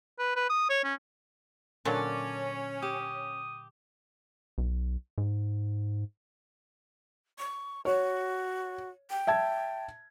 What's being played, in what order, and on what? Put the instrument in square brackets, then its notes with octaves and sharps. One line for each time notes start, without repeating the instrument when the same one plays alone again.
[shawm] B4
B4
D#6
C#5
C#4
[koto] A#2 D3 F#3 [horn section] C#4 [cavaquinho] D5 A5
[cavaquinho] G4 [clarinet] D#6
[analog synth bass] B1
G#2
[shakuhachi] C#6
[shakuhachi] F#4 [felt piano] C#5
[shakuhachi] G5
[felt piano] E5 A5 G#6